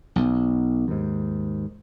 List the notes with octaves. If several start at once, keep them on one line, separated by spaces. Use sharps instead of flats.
B1
D#2 G#2